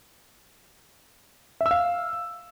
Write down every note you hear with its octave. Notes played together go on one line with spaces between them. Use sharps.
E5
E6
F5